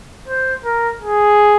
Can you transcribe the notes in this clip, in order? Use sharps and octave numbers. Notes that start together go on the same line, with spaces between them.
C5
A#4
G#4